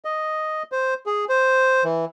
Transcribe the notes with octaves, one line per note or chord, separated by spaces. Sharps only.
D#5
C5
G#4
C5
E3